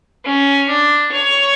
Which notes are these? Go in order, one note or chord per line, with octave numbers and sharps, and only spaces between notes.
C#4
D4
C#5